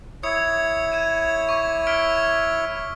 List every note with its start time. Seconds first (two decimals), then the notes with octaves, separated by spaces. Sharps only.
0.23 E4 C#5 D#6 G#6 C#7
0.92 G#6 D#7 E7
1.49 C#6 D6
1.87 F6 B6 D7